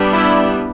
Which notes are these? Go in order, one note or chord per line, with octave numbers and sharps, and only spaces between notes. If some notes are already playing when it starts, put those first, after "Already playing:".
Already playing: G3 B3 D4
E4